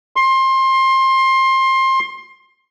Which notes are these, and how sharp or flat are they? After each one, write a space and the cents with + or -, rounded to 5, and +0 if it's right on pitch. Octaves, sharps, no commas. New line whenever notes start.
C6 +25